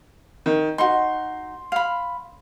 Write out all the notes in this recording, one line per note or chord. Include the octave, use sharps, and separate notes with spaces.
D#3
D#4 F#4 C6
F5 B5